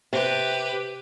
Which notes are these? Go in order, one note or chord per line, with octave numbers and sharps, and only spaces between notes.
C3 G4 B4